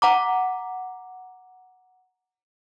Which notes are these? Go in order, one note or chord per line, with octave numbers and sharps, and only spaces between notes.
F#5 A#5 D6